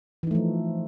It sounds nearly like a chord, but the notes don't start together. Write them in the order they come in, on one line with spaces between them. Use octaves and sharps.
E3 D#4 A3 F3